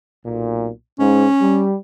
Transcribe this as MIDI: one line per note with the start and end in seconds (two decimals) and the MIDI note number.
0.25 0.70 35
0.25 0.70 46
0.99 1.25 44
0.99 1.65 61
1.41 1.74 55